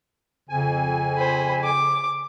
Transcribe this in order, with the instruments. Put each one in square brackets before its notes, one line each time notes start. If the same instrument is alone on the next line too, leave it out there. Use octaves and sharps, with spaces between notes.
[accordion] F2 G#5 [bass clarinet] C#3
[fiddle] C5 B5
D6